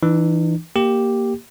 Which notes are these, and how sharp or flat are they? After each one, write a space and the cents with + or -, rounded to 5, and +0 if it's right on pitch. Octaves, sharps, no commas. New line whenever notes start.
E3 +0 D#4 -45
A#3 +0 G4 +0